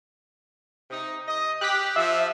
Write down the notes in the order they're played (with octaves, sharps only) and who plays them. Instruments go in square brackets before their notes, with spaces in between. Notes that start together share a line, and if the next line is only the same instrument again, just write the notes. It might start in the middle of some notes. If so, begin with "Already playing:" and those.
[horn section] C3 D#4
D#5
[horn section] G4 [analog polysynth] F#6 B6
[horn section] F3 [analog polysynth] E5